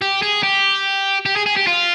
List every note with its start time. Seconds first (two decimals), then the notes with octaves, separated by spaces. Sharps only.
0.02 G4
0.22 G#4
0.43 G4
1.26 G4
1.36 G#4
1.46 G#4
1.57 G4
1.67 F4